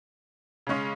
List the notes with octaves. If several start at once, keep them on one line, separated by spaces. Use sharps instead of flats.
C#3 G#3 C#4